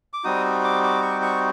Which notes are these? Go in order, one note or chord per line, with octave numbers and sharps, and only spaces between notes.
D6
G3 C4 D#4 F#4 D#6
D6
D6
C#6
C#6